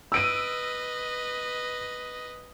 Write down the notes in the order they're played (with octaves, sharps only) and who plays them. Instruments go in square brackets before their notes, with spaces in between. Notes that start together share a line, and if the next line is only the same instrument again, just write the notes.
[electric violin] B4 D#5 [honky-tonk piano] E6 D7 D#7